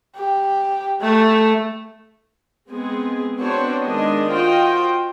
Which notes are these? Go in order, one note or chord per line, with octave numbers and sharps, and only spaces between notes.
G4
A3
G#3 B3 C4 G#4
B3 C4 D4 F#4 C5 C#5
D#3 G#3 D4 D#5
F4 F#4 C5 D#5 G5